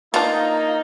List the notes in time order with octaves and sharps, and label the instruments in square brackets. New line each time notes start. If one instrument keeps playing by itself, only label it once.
[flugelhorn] A#3 [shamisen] B3 D4 [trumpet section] D#4 [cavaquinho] F4